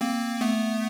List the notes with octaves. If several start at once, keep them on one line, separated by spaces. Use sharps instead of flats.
A#3 C4
A3 B3